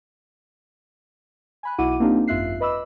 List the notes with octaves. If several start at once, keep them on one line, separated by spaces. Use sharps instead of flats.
G#5 B5 F#6
B1 E4 F#4 F#5 D6 D#7
A#3 C4 D4 D#4 F4 G4
G#1 F#2 F4 E5 F#6 C7
B4 D#5 B5 D6 E6